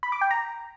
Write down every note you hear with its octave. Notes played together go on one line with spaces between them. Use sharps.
B5
D6
G5
A#5